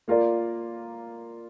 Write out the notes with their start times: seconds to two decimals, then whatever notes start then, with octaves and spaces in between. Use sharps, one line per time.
0.08 A#3 F4 A#4 D5